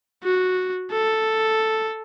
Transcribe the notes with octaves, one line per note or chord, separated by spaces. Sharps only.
F#4
A4